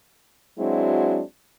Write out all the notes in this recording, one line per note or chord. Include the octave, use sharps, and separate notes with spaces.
F#3 G#3 C4 D4 E4 F#4